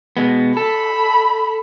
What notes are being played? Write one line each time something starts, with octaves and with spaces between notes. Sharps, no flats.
B2 G#3 B3
A4 B5